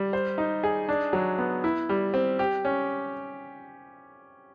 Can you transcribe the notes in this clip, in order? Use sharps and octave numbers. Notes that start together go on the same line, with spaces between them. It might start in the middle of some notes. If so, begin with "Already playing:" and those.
Already playing: G3
C5
D#4
G#4
D4
F#3
B3
E4
G3
C4
G4
C#4